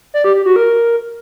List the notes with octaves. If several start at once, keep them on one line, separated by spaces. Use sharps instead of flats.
D5
G4
G4
F#4
A#4